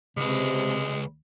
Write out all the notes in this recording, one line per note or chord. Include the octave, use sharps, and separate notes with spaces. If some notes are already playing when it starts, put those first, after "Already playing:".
C#2 C3 G#3 B4